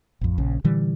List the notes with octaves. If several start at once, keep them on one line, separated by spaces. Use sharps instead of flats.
A1 F2
A#1 C#3
A#2 D3 E3 G3